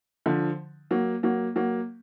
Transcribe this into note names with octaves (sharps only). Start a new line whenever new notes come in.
D3 F3
F#3 A#3
F#3 A#3
F#3 A#3